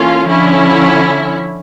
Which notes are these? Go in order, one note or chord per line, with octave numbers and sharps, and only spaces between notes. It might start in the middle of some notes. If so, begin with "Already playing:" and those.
Already playing: E3 A#3 C#4 F4 A4
D3 F3 C#4 E4